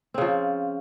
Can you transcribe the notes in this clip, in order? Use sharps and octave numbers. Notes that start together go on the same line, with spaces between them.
C#3 F3 C4